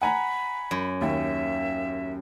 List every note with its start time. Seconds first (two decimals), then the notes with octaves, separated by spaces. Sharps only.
0.02 F#5 G#5 A#5 B5
0.71 F#2
1.01 D#2 E5